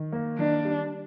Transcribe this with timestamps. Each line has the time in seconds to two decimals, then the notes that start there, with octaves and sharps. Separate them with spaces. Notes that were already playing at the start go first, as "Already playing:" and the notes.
Already playing: D#3
0.12 A#3
0.38 D#3 D4
0.65 G3